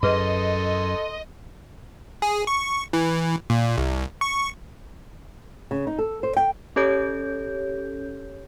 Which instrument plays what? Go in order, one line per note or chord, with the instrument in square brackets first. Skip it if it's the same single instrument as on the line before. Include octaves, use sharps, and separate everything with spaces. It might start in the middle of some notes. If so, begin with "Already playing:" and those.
[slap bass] F#2 [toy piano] G#4 B4 E5 [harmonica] A4 C6 [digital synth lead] D#5
[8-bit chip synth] G#4
C#6
E3
A#2
C2
C#6
[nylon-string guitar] C#3
D#4
A4
C5
G5
[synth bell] C#4 G4 A4 C#5 G6